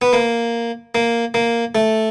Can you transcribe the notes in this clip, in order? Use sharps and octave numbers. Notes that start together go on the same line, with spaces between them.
B3
A#3
A#3
A#3
A3